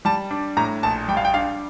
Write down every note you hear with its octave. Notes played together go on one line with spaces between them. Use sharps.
G3 A5
D4
A2 A#5
A#1 A5
G3 G5
F5
G5
D4 F5